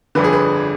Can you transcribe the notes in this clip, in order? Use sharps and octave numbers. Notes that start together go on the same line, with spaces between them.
G1 F2 D3 B4
G#4
B4